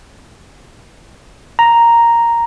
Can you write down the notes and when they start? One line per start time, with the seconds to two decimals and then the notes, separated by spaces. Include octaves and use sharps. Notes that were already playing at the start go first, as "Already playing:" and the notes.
1.59 A#5